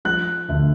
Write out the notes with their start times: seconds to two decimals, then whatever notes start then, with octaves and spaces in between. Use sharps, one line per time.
0.05 F3 F#6
0.49 D2